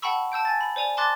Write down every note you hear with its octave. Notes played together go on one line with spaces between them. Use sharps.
F#5 G5 A5 B5 C#6 E6
A5 E6 G6 D7
G#5 A6
B5
C5 D5 G#5 F7
A5 C6 D6 F#6 A6